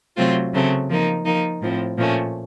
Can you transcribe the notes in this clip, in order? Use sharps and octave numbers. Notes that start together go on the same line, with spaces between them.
C3 F#3 A3 C4 F4
C#3 F#3 A3 C4
F3 A#3 D#4
F3 A#3 D#4
A2 F3 C4
A#2 F3 A3 C#4